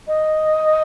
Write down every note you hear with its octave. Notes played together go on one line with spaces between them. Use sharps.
D#5